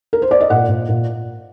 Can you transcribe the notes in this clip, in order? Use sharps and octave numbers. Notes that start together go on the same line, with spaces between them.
A#4
C5
D5
D#5
A#2 F#5
A#2
A#2